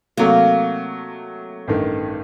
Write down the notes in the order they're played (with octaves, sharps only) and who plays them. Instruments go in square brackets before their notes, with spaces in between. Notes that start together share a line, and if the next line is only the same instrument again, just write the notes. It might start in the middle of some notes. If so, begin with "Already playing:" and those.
[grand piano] C3 F#3 A3 [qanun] A#3
[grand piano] A1 G2 D#3 A3